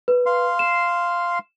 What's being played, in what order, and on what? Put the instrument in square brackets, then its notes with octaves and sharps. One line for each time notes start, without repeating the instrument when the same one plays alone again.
[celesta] B4
[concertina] F5 C6
[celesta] E7